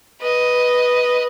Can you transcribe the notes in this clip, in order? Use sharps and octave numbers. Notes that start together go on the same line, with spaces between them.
B4 D#5